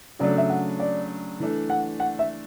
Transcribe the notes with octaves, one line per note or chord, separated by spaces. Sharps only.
C#3 F#3 A3 D4 D5
E5
F#5
D5
E3 A3 D4
F#5
F#5
E5